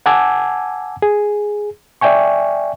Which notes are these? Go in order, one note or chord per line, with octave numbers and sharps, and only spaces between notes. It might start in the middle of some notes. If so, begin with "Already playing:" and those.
F#5 G#5 A5 D6 E6 G#6
G#4
D5 E5 G5 G#5 C#6